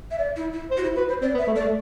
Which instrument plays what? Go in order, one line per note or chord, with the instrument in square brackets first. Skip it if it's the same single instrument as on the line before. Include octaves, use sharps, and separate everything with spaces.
[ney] E5
D5
E4
E4
[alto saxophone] C5
[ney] F#4
E4
[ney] F#4 [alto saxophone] B4
[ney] C5
[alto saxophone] C4 [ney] D5
[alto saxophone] B3
[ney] E5
[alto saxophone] A3
[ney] D5
[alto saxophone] A3